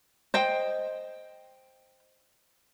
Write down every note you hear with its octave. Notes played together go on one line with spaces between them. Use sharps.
C5 D#5 G5